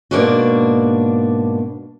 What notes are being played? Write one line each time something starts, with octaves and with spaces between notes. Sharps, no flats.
G#2 B2 A#3 D4 F#4